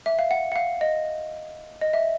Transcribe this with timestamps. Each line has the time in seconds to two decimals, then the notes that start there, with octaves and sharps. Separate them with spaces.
0.06 E5
0.19 F5
0.31 F#5
0.52 F#5
0.56 F5
0.81 D#5
1.81 D#5
1.93 E5